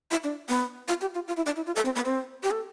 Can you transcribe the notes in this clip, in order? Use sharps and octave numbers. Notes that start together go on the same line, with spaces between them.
E4
D4
B3
F4
G4
F4
F4
E4
D4
E4
F4
A4
C4
B3
C4
G4
A4